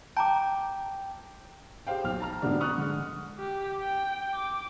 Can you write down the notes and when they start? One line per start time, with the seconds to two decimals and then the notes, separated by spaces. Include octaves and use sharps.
0.17 G5 A5 A#5 D6
1.87 G4 G#4 C5 F5 G5
2.04 B1 F6
2.20 A5 A#5 F6
2.42 G#2 B2 D3 G3 D4
2.60 C#6 D#6 F6 F#6
2.78 D3 G#3
3.39 G4
3.80 G5
4.34 D6